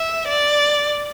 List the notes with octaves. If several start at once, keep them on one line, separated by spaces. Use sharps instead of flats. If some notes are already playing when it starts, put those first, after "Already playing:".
Already playing: E5
D5